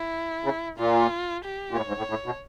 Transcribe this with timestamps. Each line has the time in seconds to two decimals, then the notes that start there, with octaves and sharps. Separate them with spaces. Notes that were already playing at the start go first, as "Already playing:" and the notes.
Already playing: E4
0.44 C#3
0.78 A#2 F4
1.44 G4
1.71 A#2
1.76 A2 C#5
1.88 G#2
1.98 A2
2.10 A2
2.26 B2